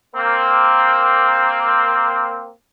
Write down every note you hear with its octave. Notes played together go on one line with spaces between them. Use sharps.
A#3 C4